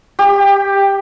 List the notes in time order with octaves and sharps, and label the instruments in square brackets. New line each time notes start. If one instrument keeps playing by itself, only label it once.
[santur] G4